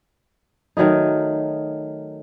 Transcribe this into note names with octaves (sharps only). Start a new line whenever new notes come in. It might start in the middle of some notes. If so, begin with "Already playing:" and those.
D#3 F#3 A3 D#4